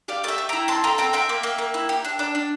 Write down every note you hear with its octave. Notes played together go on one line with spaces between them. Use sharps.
G4 D5 F5
A3 E5 G5 A5
A3
E4 G5 A#5
C4 A5 C6
A4 G5 A#5
C4 G5 A#5
C4 E5 G5
A#3
A#3
A#3
E4
G4
D4
D4
D4